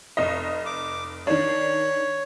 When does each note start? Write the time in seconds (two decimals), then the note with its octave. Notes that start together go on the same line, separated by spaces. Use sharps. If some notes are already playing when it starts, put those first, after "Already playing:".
0.17 F1 D#5
0.66 D6
1.27 D#3 D4 C#5